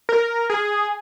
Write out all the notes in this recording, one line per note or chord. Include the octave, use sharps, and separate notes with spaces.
A#4
G#4